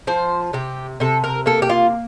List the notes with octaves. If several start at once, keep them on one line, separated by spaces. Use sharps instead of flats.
F3 C5
C3 G4
C3 A4
A#4
A#3 A4
G4
F4